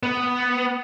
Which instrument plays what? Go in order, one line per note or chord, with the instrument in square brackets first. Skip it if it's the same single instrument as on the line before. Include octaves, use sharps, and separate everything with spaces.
[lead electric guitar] B3